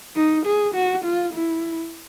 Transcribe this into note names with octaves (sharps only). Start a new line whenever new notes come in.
D#4
G#4
F#4
F4
E4